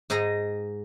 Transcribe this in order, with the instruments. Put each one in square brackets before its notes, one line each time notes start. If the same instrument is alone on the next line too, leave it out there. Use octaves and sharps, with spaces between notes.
[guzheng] G#2 D#4 G#4 D#5 A#5